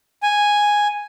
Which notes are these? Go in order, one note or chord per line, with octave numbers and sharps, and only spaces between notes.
G#5